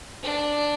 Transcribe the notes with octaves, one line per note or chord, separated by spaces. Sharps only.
D4